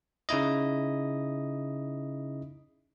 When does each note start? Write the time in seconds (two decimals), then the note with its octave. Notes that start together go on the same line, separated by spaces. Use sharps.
0.29 C#3 D#4 E4 D#5